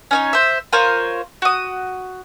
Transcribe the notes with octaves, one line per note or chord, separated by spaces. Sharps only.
C#4 D#4 C#5
C5 E5
F4 A#4 C5 C#5
F#4 D#6